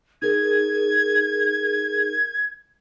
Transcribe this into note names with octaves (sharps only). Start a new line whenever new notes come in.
D#4 G#4 A#4 G#6